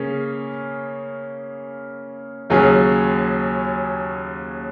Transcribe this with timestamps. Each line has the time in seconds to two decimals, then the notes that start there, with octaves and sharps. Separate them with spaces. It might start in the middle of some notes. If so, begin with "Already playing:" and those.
Already playing: C#3 A#3 C#4 G#4
2.50 D#2 C#3 F#3 C#4 G#4